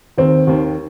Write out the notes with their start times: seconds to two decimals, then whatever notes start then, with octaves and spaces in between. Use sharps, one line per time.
0.18 D#2 D#3 C4
0.47 D#2 D#3